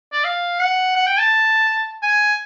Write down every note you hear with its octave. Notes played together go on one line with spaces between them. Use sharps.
D5
F5
F#5
F#5
G5
A5
G#5